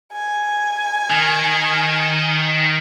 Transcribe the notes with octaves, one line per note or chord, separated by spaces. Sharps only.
G#5
D#3